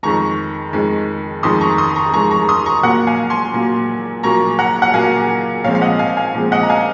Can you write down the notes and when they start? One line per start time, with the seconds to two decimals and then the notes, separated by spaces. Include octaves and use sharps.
0.03 F2 D#3 G#3 A#5 C#6
0.73 F2 D#3 G#3
1.43 F2 D#3 G#3 C6 D#6
1.61 A#5 C#6
1.78 C6 D#6
1.96 A#5 C#6
2.14 F2 D#3 G#3 A#5 C#6
2.31 A#5 C#6
2.49 C6 D#6
2.66 A#5 C#6
2.83 A#2 F#3 A#3 F#5 A#5
3.07 F5 G#5
3.30 G#5 C6
3.54 A#2 F#3 A#3
4.23 A#2 F#3 A#3 A#5 C#6
4.59 F#5 A#5
4.82 F#5
4.94 A#2 F#3 A#3 F5 G#5
5.64 A#2 F3 G#3 C4 C#5 F5
5.75 F5
5.82 D#5 F#5
5.99 F5 G#5
6.17 F5 G#5
6.35 A#2 F3 G#3 C4
6.52 D#5 F#5
6.63 A#5
6.69 F5 G#5